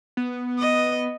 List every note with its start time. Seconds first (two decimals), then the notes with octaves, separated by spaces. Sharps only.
0.17 B3
0.59 D#5